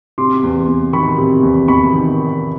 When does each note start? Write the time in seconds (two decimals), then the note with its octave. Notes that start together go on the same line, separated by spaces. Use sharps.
0.18 C3 C6 D6
0.43 E2
0.68 E2
0.93 D#3 B5 C#6
1.18 C3
1.43 E2
1.68 E2 B5 C#6
1.93 D#3